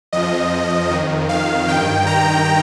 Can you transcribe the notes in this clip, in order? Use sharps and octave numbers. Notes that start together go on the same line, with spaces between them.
F2 F3 D#5
F2 D#3
F5
G2 D#3 G5
A#5